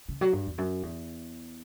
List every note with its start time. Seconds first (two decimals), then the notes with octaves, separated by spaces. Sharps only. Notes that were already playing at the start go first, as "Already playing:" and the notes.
0.09 C#3
0.21 F#3
0.33 G2
0.46 E2
0.58 F#2
0.83 E2